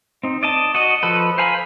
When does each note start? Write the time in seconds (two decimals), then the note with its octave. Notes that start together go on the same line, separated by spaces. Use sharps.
0.23 C4 D#4
0.43 D5 D#5 A5
0.75 F#4 D#5
1.03 F3 A4 B4
1.38 C5 F5 G#5 A#5 B5